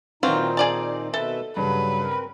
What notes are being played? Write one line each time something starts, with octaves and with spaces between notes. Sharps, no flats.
A#2 D#3 E3 F#3 C4 D#4 F4
G#4 D5 A5
B2 A4 B4 E5
G2 C#3 F#3 B4
C4 A#4